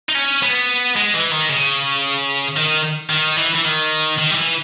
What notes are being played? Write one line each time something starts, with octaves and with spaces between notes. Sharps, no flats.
D#4
C#4
B3
G#3
E3
D#3
C#3
D#3
D#3
E3
E3
D#3
D#3
G3
E3